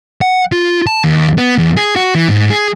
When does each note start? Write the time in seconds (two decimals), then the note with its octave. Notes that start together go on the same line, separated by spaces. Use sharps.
0.21 F#5
0.52 F4
0.87 A5
1.04 D#2
1.38 B3
1.58 E2
1.77 G#4
1.96 F#4
2.15 E3
2.29 G#2
2.51 G#4